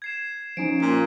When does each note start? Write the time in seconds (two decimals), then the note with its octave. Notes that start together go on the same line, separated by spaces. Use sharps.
0.02 G#6 C7 E7
0.57 F3 C#4 D#4 D7
0.82 A#2